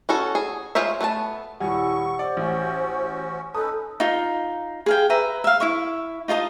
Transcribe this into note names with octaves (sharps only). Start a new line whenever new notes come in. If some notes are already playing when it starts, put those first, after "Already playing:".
C#4 F#4 A4
G#4
G#3 F4 C5 C#5 E5
A3 B3 B4 A5
D#1 G3 E4 G4 F#5 G#5 C#6
C5 D5
A1 C#4 F#4
C#4 D#4 A4 B4 A5 D#6
D#4 F4
G#4 F5 G5
B4 E5 A#5
E5 F5
E4 E5 C#6
D#4 F4 D#5 A5